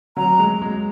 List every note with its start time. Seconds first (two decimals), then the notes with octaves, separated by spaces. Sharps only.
0.17 F#3 A#5
0.39 G#3
0.62 G#3